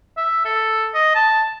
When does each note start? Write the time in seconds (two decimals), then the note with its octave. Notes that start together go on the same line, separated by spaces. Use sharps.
0.17 E5
0.45 A4
0.94 D#5
1.15 A5